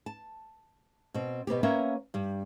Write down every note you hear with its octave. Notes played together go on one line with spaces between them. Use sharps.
A5
B2 C4
B2 B3 C4 G4
A#3 B3 C#4 A#4 C#5 E5
G2 G3